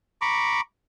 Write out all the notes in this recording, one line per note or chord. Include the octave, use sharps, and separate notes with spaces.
A#5 B5 C#6 D6